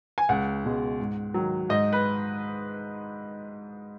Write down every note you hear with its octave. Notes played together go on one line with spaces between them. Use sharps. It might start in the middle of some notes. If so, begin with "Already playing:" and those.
G#5
C#2 F#5
B2 G#3
G#2
D#3 F#3
G#2 D#5
B4